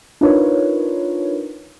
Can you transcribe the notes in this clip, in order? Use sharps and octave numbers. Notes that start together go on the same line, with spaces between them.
D4 D#4 F4 A#4 B4 C#5